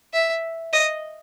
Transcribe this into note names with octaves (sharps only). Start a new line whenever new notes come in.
E5
D#5